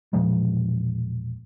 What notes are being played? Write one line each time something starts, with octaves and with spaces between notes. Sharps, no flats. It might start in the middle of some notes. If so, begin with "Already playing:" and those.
E1 A#2 F3 G#3